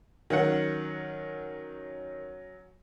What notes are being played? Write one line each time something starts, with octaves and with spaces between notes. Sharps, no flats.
D#3 F#3 C#4 F#5